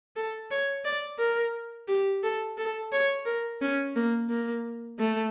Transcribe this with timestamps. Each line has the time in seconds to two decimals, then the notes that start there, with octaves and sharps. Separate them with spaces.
0.16 A4
0.51 C#5
0.85 D5
1.19 A#4
1.88 G4
2.23 A4
2.58 A4
2.92 C#5
3.26 A#4
3.61 C#4
3.96 A#3
4.29 A#3
4.99 A3